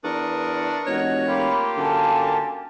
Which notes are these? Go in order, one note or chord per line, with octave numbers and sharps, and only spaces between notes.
E2 D4 A#4 C#6 D#6
F1 F#4 C#5 D#5
A#3 F4 G4 B5
F#2 D3 G#5 A5